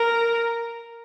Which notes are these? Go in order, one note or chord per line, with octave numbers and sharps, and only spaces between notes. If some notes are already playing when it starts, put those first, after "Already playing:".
Already playing: A#4